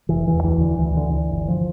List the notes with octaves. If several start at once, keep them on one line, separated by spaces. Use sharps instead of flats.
F1 E3
E2 E3
D2 E3
D3
D2 E3
D3
D3
G1
F3